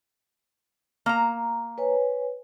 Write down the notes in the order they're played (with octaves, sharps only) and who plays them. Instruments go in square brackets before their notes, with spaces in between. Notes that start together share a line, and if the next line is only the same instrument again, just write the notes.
[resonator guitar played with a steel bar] A#3 A#5
[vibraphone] B4 C#5 G#5